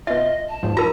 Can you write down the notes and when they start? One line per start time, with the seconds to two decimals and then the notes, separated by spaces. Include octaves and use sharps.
0.07 B2 F4 D#5 E5
0.49 A5
0.63 E2 G#2 F3
0.77 F4 A#4 A#5